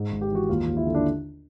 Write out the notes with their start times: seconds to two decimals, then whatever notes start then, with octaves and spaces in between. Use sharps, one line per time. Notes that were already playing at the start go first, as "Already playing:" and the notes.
Already playing: G#2
0.11 G#1
0.21 G4
0.31 E3 F#4
0.49 D#2 F4
0.67 D#2
0.77 E4
0.86 D3
0.95 D4